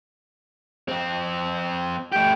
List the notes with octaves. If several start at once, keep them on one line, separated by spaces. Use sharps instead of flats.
F2 C4
A3 G4 G5